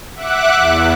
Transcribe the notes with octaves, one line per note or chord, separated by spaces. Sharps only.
E5 F#5 D6 F#6
E2